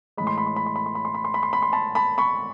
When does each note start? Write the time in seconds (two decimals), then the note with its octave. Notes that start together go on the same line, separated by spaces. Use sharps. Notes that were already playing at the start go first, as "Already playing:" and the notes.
0.17 A2 E3 G#3 B5
0.27 C6
0.38 B5
0.47 C6
0.56 B5
0.66 C6
0.76 B5
0.86 C6
0.95 B5
1.05 C6
1.14 B5
1.25 C6
1.34 B5
1.43 C6
1.53 B5
1.62 C6
1.73 A5 B5
1.95 A5 B5
2.18 B5 C#6